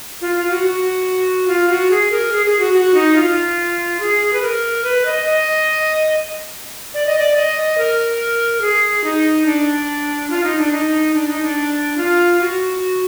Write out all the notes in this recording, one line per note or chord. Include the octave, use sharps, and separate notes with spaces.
F4
F4
F#4
F#4
F4
F#4
G#4
A#4
G#4
G#4
F#4
F#4
D#4
F4
G#4
B4
A#4
B4
D#5
D#5
D5
D#5
D5
D#5
A#4
G#4
D#4
D4
F4
D#4
D4
D#4
D4
D#4
D4
F4
F#4